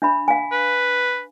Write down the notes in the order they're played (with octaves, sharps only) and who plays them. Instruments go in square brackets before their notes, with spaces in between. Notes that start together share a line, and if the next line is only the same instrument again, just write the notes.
[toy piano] D4 E5 B5
F5 G#5
[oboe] B4